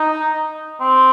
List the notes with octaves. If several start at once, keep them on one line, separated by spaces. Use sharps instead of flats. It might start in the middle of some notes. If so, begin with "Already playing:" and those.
Already playing: D#4
C4